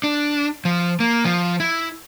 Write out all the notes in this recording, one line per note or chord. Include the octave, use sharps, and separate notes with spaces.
D4
F3
A#3
F3
E4